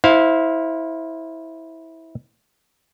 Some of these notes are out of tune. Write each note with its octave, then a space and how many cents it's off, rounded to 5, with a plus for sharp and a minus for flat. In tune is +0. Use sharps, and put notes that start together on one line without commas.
E4 -20 C5 +0 F5 +10